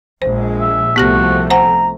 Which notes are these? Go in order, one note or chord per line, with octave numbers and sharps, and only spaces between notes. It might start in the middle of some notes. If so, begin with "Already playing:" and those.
A#1 G#3 C5
E5
C2 F3 A3 B3 F#4 G4 A#6
C5 F#5 G#5 A#5